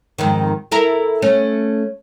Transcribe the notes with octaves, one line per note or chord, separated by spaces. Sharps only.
F2 G#2 D#3
E4 A4 A#4
A3 C#4